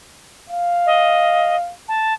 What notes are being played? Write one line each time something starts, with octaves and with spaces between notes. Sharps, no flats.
F5
D#5
A5